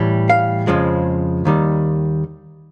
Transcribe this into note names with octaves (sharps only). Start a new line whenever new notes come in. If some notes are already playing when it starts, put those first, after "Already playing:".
Already playing: A2 E3 G3
F5
F2 C#3 F3 G#3
D#2 D#3 G3